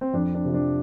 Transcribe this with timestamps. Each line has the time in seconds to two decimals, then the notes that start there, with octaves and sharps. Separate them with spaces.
0.01 C4
0.13 F2 D4
0.34 D4
0.45 C3 F3
0.54 D4